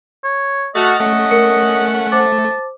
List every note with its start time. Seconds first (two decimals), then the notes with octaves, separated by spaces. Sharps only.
0.24 C#5
0.75 A3 F#4 D#5 F#5 F6 A6
1.00 A3 C#4 F#5
1.31 A#4 C#7
2.12 C5 A5 D6